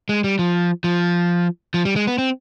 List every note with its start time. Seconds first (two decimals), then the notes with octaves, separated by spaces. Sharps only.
0.09 G#3
0.24 G3
0.39 F3
0.84 F3
1.74 F3
1.85 G3
1.96 G#3
2.07 B3
2.18 C4